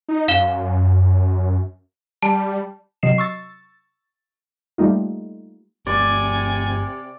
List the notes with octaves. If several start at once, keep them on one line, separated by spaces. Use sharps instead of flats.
D#4
F#2 F5 E7 G7
G3 A5
C3 F#3 D#5 C7 E7
C#6 E6 A6
G3 A3 A#3 D#4 F4
G1 C3 A3 D5 G#5